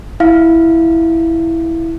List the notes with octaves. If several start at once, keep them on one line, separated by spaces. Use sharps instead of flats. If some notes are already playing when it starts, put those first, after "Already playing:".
E4 F5